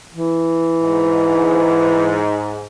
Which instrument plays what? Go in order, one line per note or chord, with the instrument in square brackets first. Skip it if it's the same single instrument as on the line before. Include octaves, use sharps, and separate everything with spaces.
[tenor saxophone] E3
[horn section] G#2